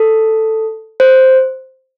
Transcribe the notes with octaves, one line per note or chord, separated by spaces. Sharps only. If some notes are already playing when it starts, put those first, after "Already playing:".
Already playing: A4
C5